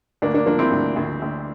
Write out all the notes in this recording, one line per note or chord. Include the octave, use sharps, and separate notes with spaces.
D2 A#3 D4
A#3 D4
F3 A#3 D4
C4 E4
D2
D2
D2